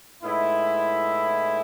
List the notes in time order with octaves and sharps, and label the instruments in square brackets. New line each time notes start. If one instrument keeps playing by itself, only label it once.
[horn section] A2 G#3 B3 D#4 E4